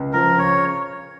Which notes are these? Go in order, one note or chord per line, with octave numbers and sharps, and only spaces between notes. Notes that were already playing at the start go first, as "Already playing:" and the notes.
Already playing: C#2
F3 A#4
C#3 C#5